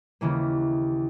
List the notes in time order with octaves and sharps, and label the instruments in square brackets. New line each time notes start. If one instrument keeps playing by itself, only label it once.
[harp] D#2 C#3 E3 A#3